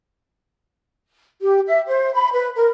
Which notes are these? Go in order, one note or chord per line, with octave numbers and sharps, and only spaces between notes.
G4
E5
C5
B5
B4
A#4